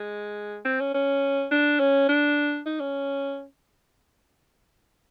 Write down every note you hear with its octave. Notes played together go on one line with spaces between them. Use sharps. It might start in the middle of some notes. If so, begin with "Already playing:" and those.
Already playing: G#3
C4
C#4
C#4
D4
C#4
D4
D#4
C#4